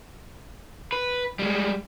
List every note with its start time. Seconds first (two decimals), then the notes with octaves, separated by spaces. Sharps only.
0.92 B4
1.39 G3 G#3